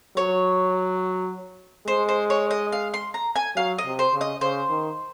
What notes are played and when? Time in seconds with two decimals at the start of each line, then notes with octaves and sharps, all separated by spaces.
0.17 F#3 C#5
1.87 G#3 C5
2.09 C5
2.30 C#5
2.51 D#5
2.72 F5
2.94 C6
3.14 A#5
3.36 G#5
3.56 F#3 F5
3.78 D#5
3.85 C3
3.99 C5
4.14 C#3
4.21 D#5
4.41 C#3 C5
4.69 D#3